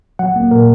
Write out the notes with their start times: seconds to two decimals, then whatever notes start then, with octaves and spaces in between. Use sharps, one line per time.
0.19 F#3 F#5
0.36 A#3
0.51 A#2 A#4